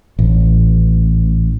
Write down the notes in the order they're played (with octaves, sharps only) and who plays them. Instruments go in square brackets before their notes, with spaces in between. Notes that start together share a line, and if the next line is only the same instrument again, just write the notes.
[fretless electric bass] A1